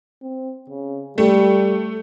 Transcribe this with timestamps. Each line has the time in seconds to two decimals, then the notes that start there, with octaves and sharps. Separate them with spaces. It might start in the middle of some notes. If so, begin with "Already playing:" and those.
0.22 C4
0.69 C#3
1.18 G3 A3